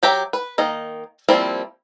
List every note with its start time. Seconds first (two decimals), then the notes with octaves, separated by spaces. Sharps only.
0.03 F#3 G4 E5 A#5
0.33 B4
0.58 D#3 A#3 D#5
1.29 F3 G3 A#3 C4 E4